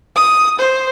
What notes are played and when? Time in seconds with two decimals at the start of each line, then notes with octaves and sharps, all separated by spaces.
0.16 D#6
0.59 C5